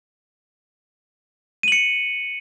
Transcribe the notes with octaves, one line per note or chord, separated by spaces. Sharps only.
C#7 D#7 F#7